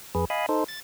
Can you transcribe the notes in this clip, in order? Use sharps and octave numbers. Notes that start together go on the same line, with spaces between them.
F2 G#4 B4
D#5 F5 G#5 B5
D#4 A4 C5
A6